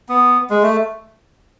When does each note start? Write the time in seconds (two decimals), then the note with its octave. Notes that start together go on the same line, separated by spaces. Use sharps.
0.09 B3
0.50 G#3
0.63 A3